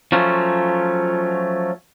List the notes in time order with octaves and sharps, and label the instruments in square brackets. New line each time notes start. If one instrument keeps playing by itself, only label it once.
[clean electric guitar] F3 F#3 A3 C#4 F4